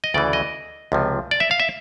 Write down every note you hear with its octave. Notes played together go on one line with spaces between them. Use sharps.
D#5
D2 C#3 E3 D5
D#5
C#2 C3 F3
D5
E5
F5
E5